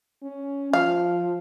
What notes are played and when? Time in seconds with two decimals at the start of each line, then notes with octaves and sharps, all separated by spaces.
0.23 C#4
0.73 F3 F5